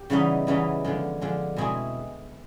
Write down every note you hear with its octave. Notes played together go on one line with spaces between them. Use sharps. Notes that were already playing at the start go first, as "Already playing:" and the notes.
Already playing: G4
C#3 E3 G3 B3 D#4
C#3 E3 G3 B3 D#4
D3 F3 G#3
D3 F3 G#3
B2 G#3 C4 E4 G#4